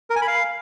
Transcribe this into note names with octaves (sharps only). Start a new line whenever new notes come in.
A#4
G#5
B5
F5